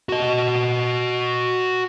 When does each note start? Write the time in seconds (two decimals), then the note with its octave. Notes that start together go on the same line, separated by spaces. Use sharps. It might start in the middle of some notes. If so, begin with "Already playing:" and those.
0.09 F#4 D#5